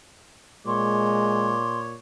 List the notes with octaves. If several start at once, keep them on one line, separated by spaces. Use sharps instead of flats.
A#2 G#3 C#5 C6 D6